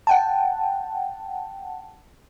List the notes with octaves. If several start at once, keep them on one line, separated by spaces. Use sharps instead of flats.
F#5 G5 A5